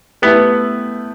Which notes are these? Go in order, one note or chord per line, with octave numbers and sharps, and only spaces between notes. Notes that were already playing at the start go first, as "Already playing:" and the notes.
A3 B3 E4 G4 B4